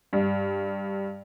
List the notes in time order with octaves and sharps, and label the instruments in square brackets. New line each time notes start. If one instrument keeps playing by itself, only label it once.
[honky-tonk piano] G2